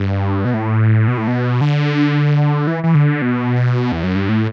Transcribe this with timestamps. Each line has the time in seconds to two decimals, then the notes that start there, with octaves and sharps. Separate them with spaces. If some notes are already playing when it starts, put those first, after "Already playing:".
Already playing: G2
0.45 B2
0.54 A2
1.08 B2
1.18 A2
1.28 B2
1.61 D3
2.67 E3
2.84 E3
2.95 D3
3.22 B2
3.92 E2
4.03 F#2
4.16 G2
4.29 A2